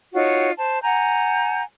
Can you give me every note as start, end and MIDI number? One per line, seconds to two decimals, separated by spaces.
0.13 0.51 63
0.13 0.51 65
0.13 0.51 66
0.13 0.51 73
0.57 0.79 72
0.57 0.79 81
0.83 1.61 78
0.83 1.61 80
0.83 1.61 82
0.83 1.61 91